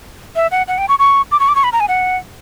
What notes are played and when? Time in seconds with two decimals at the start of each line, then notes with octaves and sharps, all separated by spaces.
0.36 E5
0.51 F#5
0.68 F#5
0.78 G5
0.89 C#6
0.99 C#6
1.32 D6
1.40 C#6
1.49 D6
1.55 C#6
1.64 B5
1.73 A#5
1.80 G#5
1.88 F#5